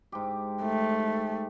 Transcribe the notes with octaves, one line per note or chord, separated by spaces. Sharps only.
G#2 G4
A3